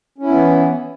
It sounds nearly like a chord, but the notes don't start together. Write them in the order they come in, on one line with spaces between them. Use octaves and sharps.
C#4 E4 B3 E3